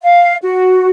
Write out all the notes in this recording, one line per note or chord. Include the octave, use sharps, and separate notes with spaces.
F5
F#4